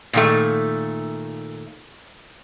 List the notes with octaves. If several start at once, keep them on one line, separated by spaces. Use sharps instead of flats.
A#2 D#3 A3